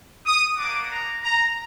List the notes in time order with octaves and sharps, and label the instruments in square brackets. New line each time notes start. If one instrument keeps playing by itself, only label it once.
[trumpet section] D#6
A#3 D4 F#4 D6
A#5
A#5